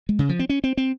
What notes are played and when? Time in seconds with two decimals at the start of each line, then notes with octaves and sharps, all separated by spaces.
0.09 G#3
0.19 C#3
0.29 F3
0.39 C4
0.49 C#4
0.64 C4
0.77 C4